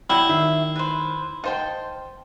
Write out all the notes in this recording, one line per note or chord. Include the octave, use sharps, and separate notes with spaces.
F#3 G3 E4 G5
D#3 E5
B4 C5
D#4 C5 F5 G5 A5